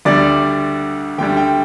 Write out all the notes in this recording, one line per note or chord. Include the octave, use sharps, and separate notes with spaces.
D2 D3 G3 D5
D2 D3 G3 G5
G5